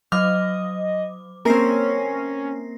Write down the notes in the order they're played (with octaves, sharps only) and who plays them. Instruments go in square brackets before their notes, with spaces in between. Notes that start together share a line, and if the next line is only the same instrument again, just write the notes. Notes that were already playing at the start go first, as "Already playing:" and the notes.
[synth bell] F#3 D6 [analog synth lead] D#5 [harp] F6
[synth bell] A#3 A#6 C7 [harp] C4 A#4 [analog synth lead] C#4